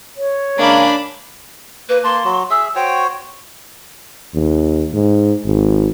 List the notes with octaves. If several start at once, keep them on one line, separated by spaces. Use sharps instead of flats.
C#5
C#3 G#3 A#3 D4 B5
A#3 B4
A#3 A5 C6
F#3 F#4
G#4 E5 E6
F#4 C5 C#5 G5
D#2
G#2
G#1